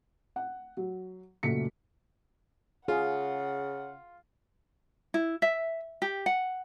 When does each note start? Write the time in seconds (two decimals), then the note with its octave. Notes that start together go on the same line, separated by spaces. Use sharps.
0.36 F#5
0.77 F#3
1.43 F#1 A#2 A3 F#4 B6 C#7
2.88 C#3 F4 G#4 F#5
5.14 E4
5.42 E5
6.02 G4
6.26 F#5